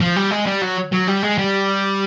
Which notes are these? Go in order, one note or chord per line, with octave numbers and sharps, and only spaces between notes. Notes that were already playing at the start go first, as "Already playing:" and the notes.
F3
G3
G#3
G3
F#3
F#3
G3
G#3
G3